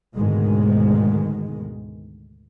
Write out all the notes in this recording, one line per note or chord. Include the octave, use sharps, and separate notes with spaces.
D2 G#2 B2 D#3 G#3